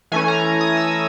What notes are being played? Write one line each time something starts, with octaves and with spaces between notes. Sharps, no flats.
E3 A3 C#4 G#5
A#5
D#6
E6